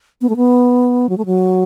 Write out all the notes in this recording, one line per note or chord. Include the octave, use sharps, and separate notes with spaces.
B3
A3
B3
F#3
A3
F#3